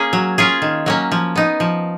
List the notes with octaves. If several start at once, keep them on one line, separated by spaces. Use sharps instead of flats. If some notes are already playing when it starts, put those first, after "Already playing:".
Already playing: A#3 C#4 G#4
F#3
C#4 F4 G#4
D#3
F#3 A#3 C#4
F3
B3 D#4
F3